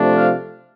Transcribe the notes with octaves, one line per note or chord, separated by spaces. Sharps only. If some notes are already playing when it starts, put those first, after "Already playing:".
Already playing: C3 F3 A3 D4
F5